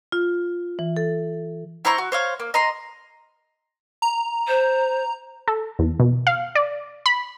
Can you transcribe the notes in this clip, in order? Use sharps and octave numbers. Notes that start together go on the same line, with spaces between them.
F4
E3
A4
E4 C5 A#5 C#6
F#4
C5 C#5 F5
A#3
D#5 A#5 C6
A#5
C5
A4
E2
B2
F5
D5
B5